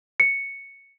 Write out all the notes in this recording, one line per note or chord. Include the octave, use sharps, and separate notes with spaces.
C#7